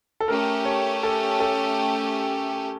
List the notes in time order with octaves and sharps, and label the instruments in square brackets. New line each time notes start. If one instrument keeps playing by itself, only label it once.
[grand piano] A4
[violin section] A3 C#4 G4 [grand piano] A#4
[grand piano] C#5
A4
A4